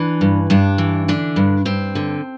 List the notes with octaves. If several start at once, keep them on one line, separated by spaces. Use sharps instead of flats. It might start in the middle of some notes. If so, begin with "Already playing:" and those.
Already playing: E3 D4
G2
G2 D4
E3
D3 D4
G2
G2 C4
D3